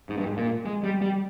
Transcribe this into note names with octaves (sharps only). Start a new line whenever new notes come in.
G#2
G2
G#2
A#2
G#3
G3
G3